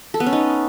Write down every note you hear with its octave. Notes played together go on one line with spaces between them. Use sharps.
A4
B3
C#4
D#4